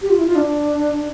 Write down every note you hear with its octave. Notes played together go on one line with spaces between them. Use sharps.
G4
F4
E4
F4
D4